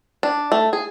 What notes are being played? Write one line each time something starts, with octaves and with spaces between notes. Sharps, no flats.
D4
A3
G#4